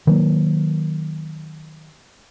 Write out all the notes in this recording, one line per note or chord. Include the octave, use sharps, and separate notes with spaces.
D#3 F#3 A#3